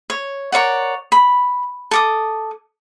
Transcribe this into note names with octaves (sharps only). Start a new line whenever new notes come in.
C#5
A#4 C#5 D5 F#5
B5
A4 D6 D#6